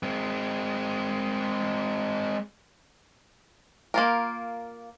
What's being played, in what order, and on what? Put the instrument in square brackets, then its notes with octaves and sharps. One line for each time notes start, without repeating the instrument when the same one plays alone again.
[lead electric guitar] G#3 C4
[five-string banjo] A#3 F4 A#4